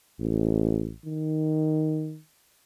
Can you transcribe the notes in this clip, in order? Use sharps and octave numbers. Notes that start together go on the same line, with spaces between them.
A1
D#3